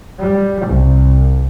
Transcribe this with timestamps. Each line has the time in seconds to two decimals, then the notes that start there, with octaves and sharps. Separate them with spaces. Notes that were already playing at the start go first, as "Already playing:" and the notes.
0.20 G3
0.67 C2